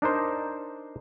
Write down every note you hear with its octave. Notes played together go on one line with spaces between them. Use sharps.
D4 D#4 A#4 C5